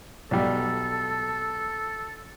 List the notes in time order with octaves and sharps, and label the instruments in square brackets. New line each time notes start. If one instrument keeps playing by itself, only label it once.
[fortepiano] B1 G3 [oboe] A4